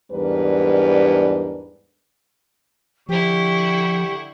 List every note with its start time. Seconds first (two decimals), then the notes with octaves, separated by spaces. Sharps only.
0.12 E2 G#2 G3 D4 A#4 B4
3.09 D3 F3 E4 G4 F#5 C#6